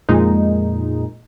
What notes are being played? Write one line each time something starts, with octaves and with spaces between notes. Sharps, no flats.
F2 A#2 G#3 D#4